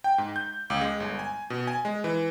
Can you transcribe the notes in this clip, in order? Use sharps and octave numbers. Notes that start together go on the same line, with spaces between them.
G5
G#2
G6
C#2
G#3
G1
G#5
B2
G#5
G#3
E3